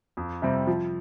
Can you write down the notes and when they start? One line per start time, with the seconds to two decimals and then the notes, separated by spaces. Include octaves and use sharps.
0.17 F2
0.42 C3 G3 C4
0.67 F3